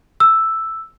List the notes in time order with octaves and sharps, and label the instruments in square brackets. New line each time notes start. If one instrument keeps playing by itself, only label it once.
[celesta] E6